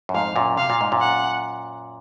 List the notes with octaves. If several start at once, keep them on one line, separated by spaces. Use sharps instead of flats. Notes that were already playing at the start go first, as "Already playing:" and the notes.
F#2
F2 G#2 F5
F#2 A#2
C3 F5
A#2
G#2
F#2 A#2
F#5